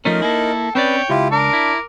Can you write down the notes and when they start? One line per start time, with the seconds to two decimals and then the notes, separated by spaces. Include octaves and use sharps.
0.05 F3 A3 C#4 D#4 A#4
0.22 A#3 E4 A4
0.75 C4 C#4 B4 C#5 D5 G5
1.10 C#2 E4 F4 G4
1.31 D4 A#4 D6
1.53 E4